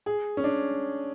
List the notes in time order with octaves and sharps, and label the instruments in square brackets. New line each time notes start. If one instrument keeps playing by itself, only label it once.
[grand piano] G#4
C#4
D4